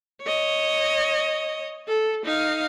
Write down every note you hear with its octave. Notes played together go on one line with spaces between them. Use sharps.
C#5 D#5
A4
D#4 F5